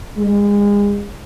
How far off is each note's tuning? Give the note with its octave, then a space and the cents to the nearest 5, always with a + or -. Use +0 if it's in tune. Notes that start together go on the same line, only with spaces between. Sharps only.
G#3 -30